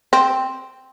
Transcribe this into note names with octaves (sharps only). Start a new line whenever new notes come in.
C4